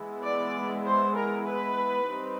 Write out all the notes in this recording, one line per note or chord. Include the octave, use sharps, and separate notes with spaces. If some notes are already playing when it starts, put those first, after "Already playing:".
Already playing: E3 G#3 B3 E4
D5
C5
A#4
B4
G3 C4 D#4